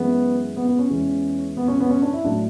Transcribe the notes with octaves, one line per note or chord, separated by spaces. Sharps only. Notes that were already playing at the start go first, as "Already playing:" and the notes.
Already playing: F#2 E3 G#3 B3
B3
B3
C#4
E2 C#3 E3 G#3
B3
C#4
B3
C#4
D4
E4
A2 F#3 A3 D4